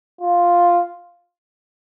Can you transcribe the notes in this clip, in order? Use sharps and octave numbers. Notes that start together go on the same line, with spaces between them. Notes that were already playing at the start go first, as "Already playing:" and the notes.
F4